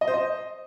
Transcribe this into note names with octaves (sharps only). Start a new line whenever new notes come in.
D#5
C5
D#5